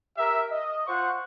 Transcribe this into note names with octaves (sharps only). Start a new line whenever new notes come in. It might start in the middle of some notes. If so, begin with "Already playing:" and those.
G4 A#4 E5
D#5
F4 C5 F#5 C#6